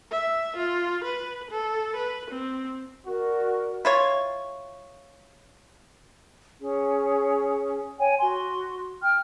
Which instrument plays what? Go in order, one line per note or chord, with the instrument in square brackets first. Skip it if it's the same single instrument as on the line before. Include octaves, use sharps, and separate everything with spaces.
[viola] E5
F4
B4
A4
B4
C4
[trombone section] F#4 [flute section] A#4 D5
[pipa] E4 F4 C#5
[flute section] C#4 G#4
C#5 G5 G#5
F#4 C6
G5 F6